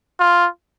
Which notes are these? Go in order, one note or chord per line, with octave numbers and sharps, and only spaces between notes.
F4